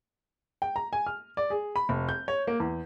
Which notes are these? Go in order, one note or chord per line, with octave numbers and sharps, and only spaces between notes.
G5
A#5
G#5
F6
D5
G#4
B5
F1
G6
C#5
A#3
E2